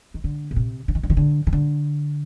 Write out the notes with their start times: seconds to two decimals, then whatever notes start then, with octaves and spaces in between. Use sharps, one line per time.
0.14 D#3
0.24 D3
0.51 A#2
0.56 C3
0.88 D3
0.95 D#3
1.03 D3
1.10 D#3
1.17 D3
1.47 D#3
1.53 D3